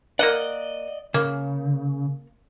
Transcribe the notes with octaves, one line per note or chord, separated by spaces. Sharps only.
A#3 D5 D#5 F#5
C#3 A#3